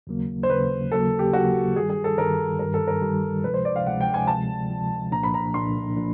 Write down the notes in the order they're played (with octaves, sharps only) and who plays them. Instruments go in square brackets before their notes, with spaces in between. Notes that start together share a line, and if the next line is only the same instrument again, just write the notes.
[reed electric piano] D#2 C#3 F#3 A#3
[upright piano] C5
[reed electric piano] D#2 C#3 F#3 A#3 [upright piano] B4
[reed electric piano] D#2 C#3 F#3 A#3 [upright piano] A4
[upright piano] G4
[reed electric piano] D#2 C#3 F#3 A#3 [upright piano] F#4
[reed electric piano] G2 D#3 G3 [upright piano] G#4
[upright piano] G#4
A4
[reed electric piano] G2 D#3 G3 [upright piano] A#4
[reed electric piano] G2 D#3 G3 [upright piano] A#4
[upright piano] A4
A#4
[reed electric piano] G2 D#3 G3
[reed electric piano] D2 C3 F3 G#3 [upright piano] B4
[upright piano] C5
D5
F5
[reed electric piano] D2 C3 F3 G#3 [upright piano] F#5
[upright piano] G5
G#5
[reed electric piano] D2 C3 F3 G#3 [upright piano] A5
[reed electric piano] D2 C3 F3 G#3
[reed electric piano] C2 A#2 F3 A#3 D4 [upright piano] A#5
[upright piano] B5
A#5
[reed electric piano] C2 A#2 F3 A#3 D4 [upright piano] C6
[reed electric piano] F3 A#3 D4